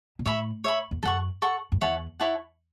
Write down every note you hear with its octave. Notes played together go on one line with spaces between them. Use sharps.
B2
A2 C#5 E5 B5
C#5 E5 B5
E2
F#2 A4 F#5 C#6
A4 F#5 C#6
F#2
E2 E4 C#5 F#5 A5
E4 C#5 F#5 A5